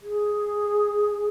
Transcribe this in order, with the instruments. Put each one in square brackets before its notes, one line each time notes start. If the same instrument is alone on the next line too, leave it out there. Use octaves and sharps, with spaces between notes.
[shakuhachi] G#4